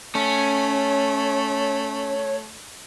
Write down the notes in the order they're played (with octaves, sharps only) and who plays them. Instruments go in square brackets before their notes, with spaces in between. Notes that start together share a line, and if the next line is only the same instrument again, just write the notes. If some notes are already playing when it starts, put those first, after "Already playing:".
[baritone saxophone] A3 [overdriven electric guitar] C#4 [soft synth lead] C#5